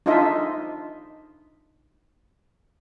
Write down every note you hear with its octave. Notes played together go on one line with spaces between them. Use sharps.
D4 D#4 F4 D#5 E5